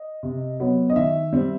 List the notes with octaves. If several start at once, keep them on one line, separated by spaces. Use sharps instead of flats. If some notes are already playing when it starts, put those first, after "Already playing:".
Already playing: D#5
C3
F#3 B3
D#5
D#3 E5
G3 C4